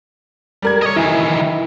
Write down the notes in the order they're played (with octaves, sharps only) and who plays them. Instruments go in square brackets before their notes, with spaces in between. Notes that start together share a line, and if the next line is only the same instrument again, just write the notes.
[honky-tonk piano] G3 A#4 G#6
[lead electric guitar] C#5 D#5
[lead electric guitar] D#3 E3 [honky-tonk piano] E4